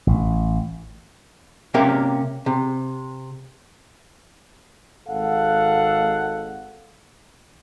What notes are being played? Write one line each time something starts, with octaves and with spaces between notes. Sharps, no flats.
A1
C3 A#3 C#4 G4 A#4
C3
G#1 A4 F5 F#5